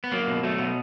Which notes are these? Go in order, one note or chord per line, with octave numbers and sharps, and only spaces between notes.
B3
F#3 A#3
B2
F#3 A3
B2